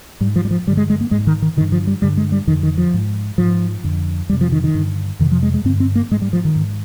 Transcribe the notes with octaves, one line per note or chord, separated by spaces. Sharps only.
G#2 G3
F3
G3
F3
G2 D3 G3
G#3
G#3
A#3
G#2 G#3
D#3
D#3
G2 D3 D#3
F3
G3
G2 D3 G3
G#3
G3
F2 D3 D#3
D#3
F3
G#2
G#2 F3
F2 D3
F2 C3 G3
F3
D#3
D#3
G2 D3
F2 C3 D#3
F3
G#3
G#3
G2 D3 C4
C4
A#3
G#2 G#3
G3
F3
D#3
G#2